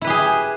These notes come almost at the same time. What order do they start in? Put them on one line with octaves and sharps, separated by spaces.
E4 B4 G4 G#4